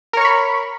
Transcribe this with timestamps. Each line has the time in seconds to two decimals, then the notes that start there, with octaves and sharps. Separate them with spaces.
0.13 A#4
0.17 C#5
0.21 C#6
0.25 B5